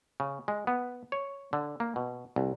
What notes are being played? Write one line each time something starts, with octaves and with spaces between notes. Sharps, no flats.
C#3
G#3
B3
C#5
D3
A#3
B2
C2